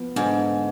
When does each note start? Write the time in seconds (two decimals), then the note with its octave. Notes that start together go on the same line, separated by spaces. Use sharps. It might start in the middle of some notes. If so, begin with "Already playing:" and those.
Already playing: F3 B3
0.16 G#2 D3